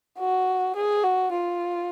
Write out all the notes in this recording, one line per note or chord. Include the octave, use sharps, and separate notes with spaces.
F#4
G#4
F#4
F4